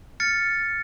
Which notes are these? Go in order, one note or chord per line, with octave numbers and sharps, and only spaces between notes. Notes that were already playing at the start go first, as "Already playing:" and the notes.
F6 A6 C#7